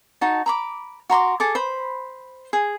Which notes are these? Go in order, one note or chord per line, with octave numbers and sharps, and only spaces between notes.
D#4 F#4 A5
A#5 B5 D6
F#4 A#5 C6 D6
G#4 A4 D6
C5 B5
G#4